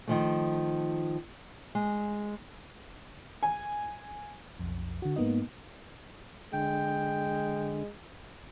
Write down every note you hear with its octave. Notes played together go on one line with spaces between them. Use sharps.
D#3 F3 A3
G#3
G#5
B1 F2
D3 F#4
G#2 A#3 B3 D#4 D#5
D3 G#3 G5